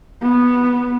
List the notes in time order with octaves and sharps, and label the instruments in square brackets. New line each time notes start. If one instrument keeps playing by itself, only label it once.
[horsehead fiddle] B3